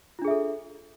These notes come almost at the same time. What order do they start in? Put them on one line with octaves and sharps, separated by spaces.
F4 D4 G#4 E5 A4